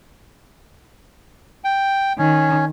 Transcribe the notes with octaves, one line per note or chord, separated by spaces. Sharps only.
G5
D#3 C#4